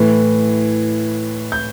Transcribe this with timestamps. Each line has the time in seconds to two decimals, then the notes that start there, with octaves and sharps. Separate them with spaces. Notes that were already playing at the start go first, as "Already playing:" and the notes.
Already playing: A2 E3
1.52 G6